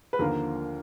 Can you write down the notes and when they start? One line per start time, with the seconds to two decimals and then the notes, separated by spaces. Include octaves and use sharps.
0.13 B4
0.19 D#2 D3 F3 A#3 A#4